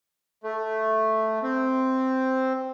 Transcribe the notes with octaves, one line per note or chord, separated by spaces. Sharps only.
A3
C4